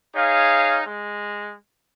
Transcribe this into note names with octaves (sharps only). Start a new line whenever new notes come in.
D#4 G#4 C#5 F5
G#3